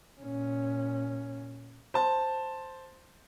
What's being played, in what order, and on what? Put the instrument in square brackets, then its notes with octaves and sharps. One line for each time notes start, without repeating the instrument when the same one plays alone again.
[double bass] A#2 C#4
[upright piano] C5 A5